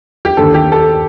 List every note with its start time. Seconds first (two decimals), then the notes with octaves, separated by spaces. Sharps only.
0.25 G4
0.37 D#2 D3 A4
0.54 G4
0.72 A4